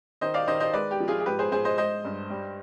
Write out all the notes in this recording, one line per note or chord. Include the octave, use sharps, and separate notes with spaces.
D#3 C5 D#5
D5 F5
D#3 C5 D#5
C5 D#5
G#3 B4 D5
G4
F3
F4 G#4
G#4
G#2 G4 B4
G#4 C5
G#2 G#4 C5
C5 D#5
G#3 C5 D#5
G2
G3